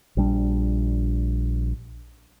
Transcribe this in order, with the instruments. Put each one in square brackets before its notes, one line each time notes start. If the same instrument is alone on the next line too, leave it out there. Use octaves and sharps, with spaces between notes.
[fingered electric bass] A#1 G3 D4